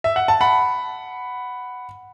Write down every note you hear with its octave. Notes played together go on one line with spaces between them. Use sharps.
E5
F#5
A5
F#5 B5